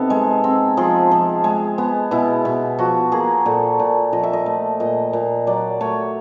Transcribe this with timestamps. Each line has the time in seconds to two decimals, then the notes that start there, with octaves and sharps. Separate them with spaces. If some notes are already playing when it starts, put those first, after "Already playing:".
Already playing: C3 B3 D#4 A4
0.10 G#3
0.44 C4
0.77 F3 G#4
1.11 F3
1.44 G#3
1.78 B3
2.11 B2 E4
2.45 B2
2.78 F3 F#4
3.12 A#3 G#4
3.46 A#2 A4
3.79 A#2
4.13 F3 D#5
4.23 E5
4.33 D#5
4.46 A3
4.80 A#2 D#5
5.13 A#2
5.47 F#3 D5
5.81 A3 C#5